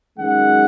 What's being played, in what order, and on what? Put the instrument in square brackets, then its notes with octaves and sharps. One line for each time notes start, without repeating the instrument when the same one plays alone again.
[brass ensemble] F#2 D#3 G#3 C#4 F#5